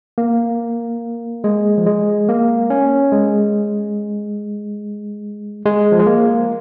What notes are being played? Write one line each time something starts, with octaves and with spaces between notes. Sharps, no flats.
A#3
G#3
F3
G#3
A#3
C#4
G#3
G#3
F3
G#3
A#3